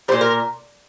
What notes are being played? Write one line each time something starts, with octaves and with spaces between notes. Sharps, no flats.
A#2 G3 C5
A#4